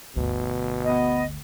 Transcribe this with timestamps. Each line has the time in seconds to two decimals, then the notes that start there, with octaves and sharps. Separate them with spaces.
0.16 G1 D2 B2
0.84 B3 D#5